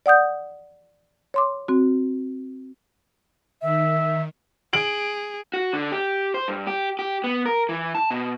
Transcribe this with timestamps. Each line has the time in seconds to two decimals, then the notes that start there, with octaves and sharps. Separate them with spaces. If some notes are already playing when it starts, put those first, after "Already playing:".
0.06 D5 F#5 D#6 G6
1.34 C#5 C6 D6
1.68 C4 F#4
3.62 D#3 E5
4.73 G#4 D7 F#7
5.54 F#4
5.73 D3
5.92 G4
6.34 C5
6.48 G2
6.67 G4
6.99 G4
7.24 B3
7.46 A#4
7.69 E3
7.95 A5
8.11 B2